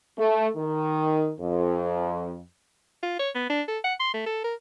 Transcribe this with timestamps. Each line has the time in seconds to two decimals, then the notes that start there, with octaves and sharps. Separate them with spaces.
0.18 A3
0.57 D#3
1.40 F2
3.03 F4
3.19 C#5
3.35 B3
3.50 D4
3.68 A4
3.84 F#5
4.00 C6
4.14 A3
4.26 A4
4.44 A#4